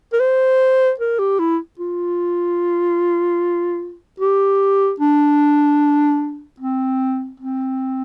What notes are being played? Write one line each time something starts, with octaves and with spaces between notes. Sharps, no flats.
A#4
C5
A#4
G4
E4
F4
G4
D4
C4
C4